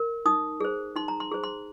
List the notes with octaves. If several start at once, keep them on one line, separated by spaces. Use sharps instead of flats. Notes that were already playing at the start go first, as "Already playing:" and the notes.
Already playing: A#4
D#4 D#6
G#4 C5
D#4 C6
A#5
C6
G#4 C5
C6